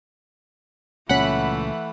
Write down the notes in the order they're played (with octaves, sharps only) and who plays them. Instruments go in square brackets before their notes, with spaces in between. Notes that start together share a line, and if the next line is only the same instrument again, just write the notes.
[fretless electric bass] C#2 A#2 C#4 [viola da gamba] E3 A3 [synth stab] F#5 B5 F#6